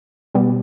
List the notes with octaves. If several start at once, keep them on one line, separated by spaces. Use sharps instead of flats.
B2 G3 B3